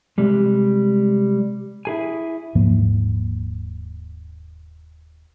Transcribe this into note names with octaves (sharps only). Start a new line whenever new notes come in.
C3 G3 G#3
E4 G#4 G#5
D#1 G#2 F3 A#3